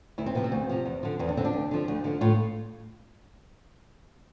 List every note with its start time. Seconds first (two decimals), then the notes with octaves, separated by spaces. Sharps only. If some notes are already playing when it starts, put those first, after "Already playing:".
0.18 D2 E4
0.26 C4
0.35 C3 F3 B3
0.44 C4
0.52 D2
0.69 C3 F3
0.85 E2
1.03 D3 F3
1.19 E2 C4
1.29 D4
1.37 D3 F3 C4
1.45 D4
1.53 D2
1.71 D3 F3
1.88 D2
2.04 D3 F3
2.21 A2 F4